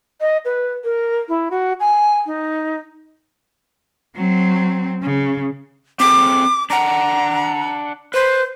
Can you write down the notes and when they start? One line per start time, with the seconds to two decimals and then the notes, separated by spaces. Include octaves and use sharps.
0.21 D#5
0.45 B4
0.84 A#4
1.29 E4
1.51 F#4
1.80 G#5
2.26 D#4
4.16 F#3 C4
5.02 C#3
6.00 C4 G#4 A4 D6
6.70 D4 F#5 A#5
8.14 B4 C5